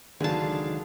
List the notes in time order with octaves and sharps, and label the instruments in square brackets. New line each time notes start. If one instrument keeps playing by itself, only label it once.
[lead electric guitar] C#2 D#3 [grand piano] D3 F#3 [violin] D4 F5 [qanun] G#4 A5